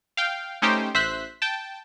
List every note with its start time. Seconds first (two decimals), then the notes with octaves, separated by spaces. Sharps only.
0.17 F5 G5
0.62 A3 C#4 D#4 G4 C5 G5
0.94 A1 C5 E5 F#6 B6
1.42 G5 A5